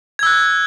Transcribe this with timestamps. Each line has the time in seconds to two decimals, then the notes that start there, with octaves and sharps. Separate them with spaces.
0.19 G#6
0.23 E6
0.27 F#6